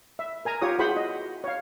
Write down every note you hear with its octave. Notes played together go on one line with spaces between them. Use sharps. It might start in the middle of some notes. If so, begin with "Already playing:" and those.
E5
A#4 G#5 A#5
F4 G4 C#5 D#6
E4 F#4 G#4 C5 F#5 B5
D#5
C#5 F5